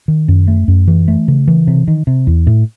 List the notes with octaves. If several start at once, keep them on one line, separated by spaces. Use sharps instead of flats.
D#3
F#2
A3
F#2
E3
A3
C#3
E3
C3
D#3
C3
E2
A2